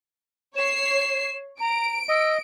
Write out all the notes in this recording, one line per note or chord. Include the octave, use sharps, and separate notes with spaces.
C#5 C7 E7
A#5 D7
D#5 E6